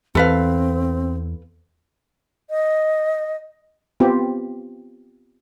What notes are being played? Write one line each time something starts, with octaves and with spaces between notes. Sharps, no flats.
E2 C4 A4 B4 F5
D#5
B3 C4 F4 G4